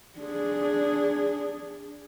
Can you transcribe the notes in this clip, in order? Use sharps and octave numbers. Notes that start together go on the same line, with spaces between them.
D4 G#4